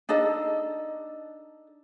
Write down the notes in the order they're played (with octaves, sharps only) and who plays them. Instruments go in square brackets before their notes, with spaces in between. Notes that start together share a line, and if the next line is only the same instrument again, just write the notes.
[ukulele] D4 D#4 A4 D#5